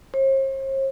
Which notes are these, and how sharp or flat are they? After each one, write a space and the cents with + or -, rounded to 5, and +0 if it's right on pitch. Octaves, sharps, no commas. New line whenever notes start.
C5 +45